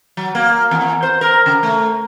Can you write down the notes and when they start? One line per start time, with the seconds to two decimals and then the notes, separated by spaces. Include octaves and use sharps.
0.17 F#3
0.35 A#3
0.71 E2
1.03 C5
1.21 A#4
1.46 C#3
1.63 A3